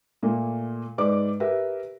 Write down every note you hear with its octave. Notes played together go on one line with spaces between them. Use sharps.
A#2 A3 A#3
G#2 B4 D5 D6
G4 A#4 B4 E5